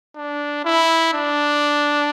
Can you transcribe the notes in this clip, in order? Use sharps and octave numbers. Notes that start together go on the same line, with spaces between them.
D4
E4
D4